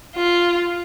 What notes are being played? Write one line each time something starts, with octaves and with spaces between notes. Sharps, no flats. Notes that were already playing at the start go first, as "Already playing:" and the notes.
F4